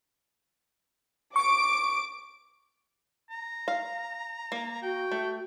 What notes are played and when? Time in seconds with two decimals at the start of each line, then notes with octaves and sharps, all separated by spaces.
1.36 C#6 D6 D7
3.30 A#5
3.68 F5
4.52 A#3
4.83 F#4 G5
5.11 A3